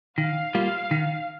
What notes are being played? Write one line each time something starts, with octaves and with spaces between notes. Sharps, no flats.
D#3 F5
G3 A#3 F4
D#3